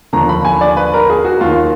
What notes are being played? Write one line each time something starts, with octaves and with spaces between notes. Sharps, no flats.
D#2 D3 F3 A#5
B5
G#5
D5
B4
A#4
G#4
F#4
D#2 D#3 F4